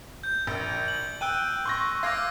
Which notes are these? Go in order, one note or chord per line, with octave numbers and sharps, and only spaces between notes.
G6
A#1
F#7
G5 E6 F#6 D#7
C6 C#6 A#6
F5 D6 E6 F6 G#6 A#6